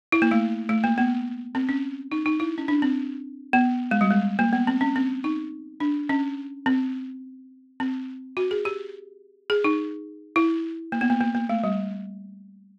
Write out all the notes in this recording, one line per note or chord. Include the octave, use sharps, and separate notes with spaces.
E4
A#3
A3
A3
A#3
B3
C4
C#4
D#4
D#4
E4
C#4
D4
C4
B3
G#3
G3
G#3
A#3
B3
C4
C#4
C4
D#4
D4
C#4
C4
C4
F#4
G#4
G4
G#4
D#4
E4
A#3
B3
A#3
A#3
A#3
A3
G3